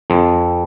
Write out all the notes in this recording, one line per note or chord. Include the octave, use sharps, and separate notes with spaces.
F2